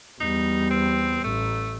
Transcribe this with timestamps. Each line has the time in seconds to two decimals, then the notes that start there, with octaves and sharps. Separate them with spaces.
0.21 E2 G3 D#4
0.70 C4
1.24 A1 A3